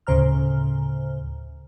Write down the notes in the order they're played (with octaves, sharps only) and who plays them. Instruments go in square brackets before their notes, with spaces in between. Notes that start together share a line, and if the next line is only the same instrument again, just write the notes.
[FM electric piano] D2 A2 C#3 C5 A#5 F6